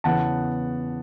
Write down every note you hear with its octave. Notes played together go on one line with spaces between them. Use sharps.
E2 C#3 E3 B3 F#5 A5